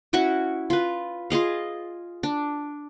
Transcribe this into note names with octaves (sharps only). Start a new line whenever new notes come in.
C#4 E4 F#4 C#6
F4 B4
F4 G#4 D#5 F5
D4